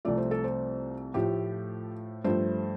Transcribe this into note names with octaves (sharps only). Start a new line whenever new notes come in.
C2 C3 F3 A3 D5
C5
A4
C5
A2 F3 A3 G4
G2 F3 A3 C5